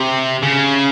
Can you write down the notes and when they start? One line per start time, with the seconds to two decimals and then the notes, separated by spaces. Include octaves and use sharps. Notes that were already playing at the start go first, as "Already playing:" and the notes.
Already playing: C3
0.43 C#3